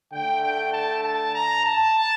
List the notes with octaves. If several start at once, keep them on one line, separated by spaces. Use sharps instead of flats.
D3 A3 G5
G5
A5
A5
A#5
A5